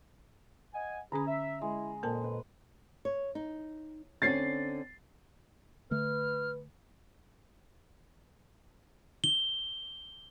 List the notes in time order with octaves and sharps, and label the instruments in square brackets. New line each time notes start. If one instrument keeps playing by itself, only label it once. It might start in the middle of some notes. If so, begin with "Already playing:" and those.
[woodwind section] D#5 F#5 G#5
[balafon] D3 C#4 B5 [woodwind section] G#4 [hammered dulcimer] A#5
[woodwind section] E5
[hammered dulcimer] G#3 [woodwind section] E4
[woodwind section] F2 A#2 [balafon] A#3 A#4 A5
[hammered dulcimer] B4
[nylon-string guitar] C#5
D#4
[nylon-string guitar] D3 C4 C#4 [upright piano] A6 C7
[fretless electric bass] D3 A3 [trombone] B4 [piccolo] F6
[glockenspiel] G7